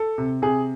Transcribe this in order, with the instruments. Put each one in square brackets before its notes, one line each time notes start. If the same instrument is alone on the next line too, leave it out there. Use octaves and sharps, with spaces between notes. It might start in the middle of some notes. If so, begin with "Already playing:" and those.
Already playing: [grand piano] A4
C3
C3 G#4